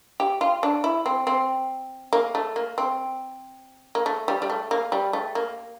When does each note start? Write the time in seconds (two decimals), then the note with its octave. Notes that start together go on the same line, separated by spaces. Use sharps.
0.20 G4
0.41 F4
0.63 D4
0.84 E4
1.06 C4
1.27 C4
2.13 A#3
2.35 A3
2.56 A#3
2.78 C4
3.95 A#3
4.06 A3
4.28 G3
4.42 G3
4.50 A3
4.71 A#3
4.92 G3
5.13 A3
5.35 A#3